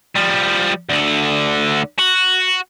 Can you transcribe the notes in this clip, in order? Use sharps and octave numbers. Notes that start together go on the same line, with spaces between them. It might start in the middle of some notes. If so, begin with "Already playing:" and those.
F3 G3
D2 D3
F#4